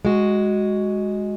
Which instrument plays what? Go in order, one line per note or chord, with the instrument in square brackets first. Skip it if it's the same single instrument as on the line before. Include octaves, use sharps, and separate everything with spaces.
[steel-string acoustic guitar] G#3 F#4